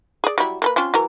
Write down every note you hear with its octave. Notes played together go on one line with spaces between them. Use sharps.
G#4 D5
F#3 G3 E4
A#3 A4 B4
C4 C#4 F4
E3 F#3 A#4